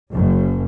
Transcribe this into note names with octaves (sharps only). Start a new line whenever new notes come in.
F#1 F#2